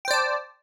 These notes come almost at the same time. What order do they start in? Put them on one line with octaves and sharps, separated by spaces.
G5 C5 D5 A5